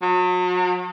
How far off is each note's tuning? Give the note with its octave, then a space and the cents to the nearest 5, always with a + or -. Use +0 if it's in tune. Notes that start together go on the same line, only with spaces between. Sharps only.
F#3 -35